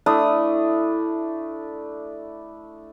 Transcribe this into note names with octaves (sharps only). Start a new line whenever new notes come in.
A3 D4 E4 D#6